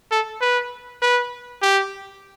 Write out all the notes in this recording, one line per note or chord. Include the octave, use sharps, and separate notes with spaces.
A4
B4
B4
G4